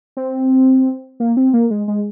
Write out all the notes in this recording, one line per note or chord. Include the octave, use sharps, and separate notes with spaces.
C4
A#3
C4
A#3
G#3
G#3